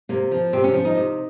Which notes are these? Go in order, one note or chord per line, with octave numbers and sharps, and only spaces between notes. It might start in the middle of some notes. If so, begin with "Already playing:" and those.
C3 A#3
F3
C3 C4
C#4
F3
D#4
C3